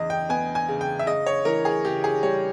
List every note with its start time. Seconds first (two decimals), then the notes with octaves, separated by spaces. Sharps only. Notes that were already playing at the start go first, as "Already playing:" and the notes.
Already playing: E2 C#3 D#5
0.10 G5
0.29 B3 G#5
0.55 G#5
0.68 C#3
0.81 G5
0.99 E5
1.07 C#3 D#5
1.27 C#5
1.45 E3 A#4
1.65 G#4
1.85 C#3 G4
2.04 G#4
2.23 G3 C#5